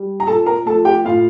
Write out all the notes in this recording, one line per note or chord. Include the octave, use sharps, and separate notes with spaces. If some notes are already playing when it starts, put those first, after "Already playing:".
Already playing: G3
A#5
A#2 A4 A5
A#4 A#5
F3 A3 A4 A5
G4 G5
A2 F4 F5